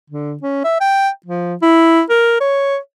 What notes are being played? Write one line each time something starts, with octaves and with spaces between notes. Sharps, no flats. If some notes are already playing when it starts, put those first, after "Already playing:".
D3
C#4
E5
G5
F3
E4
A#4
C#5